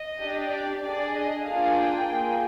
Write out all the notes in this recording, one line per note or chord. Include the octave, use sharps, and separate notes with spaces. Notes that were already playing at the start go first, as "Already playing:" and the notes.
Already playing: D#5
D4 G4
D5
D4 G#4 D5
D#5
A#3 D4 F4 G#4 F5
G5
A#3 F4 G#4